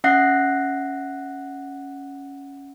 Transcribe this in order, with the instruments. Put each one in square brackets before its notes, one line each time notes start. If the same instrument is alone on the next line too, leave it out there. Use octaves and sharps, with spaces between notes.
[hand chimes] C#4 E5 F#5 F#6 A#6 C7